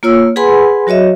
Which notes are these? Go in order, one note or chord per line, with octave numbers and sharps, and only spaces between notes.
A#3 F4 C#5 E6
G#4 B4 F#5 G#5 B5 C6
F#3 F#4 C#5 D#5 E5